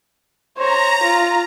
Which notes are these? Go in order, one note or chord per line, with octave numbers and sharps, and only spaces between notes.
C5 C#5 A#5
F4